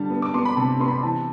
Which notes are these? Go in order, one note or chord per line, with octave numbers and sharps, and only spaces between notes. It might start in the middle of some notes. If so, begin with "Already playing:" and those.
Already playing: D3 G3 A5
B3
D6
B3 C6
B5
C3 A5
B3 C6
B5
E3 A5